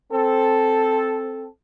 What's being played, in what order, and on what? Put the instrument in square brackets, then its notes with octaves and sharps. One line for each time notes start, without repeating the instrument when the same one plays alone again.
[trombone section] C4 A4